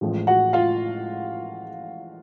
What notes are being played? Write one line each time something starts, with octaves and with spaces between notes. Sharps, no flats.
A1 A2 F3 G#3
F#4 F#5
F4 F5